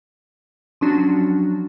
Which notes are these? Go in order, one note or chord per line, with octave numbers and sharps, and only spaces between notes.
F3 F#3 C#4 D4 F#4